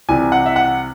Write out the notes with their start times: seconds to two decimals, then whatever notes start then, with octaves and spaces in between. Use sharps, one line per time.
0.09 C2 C3 E3 G#5
0.32 F#5
0.46 E5
0.56 F#5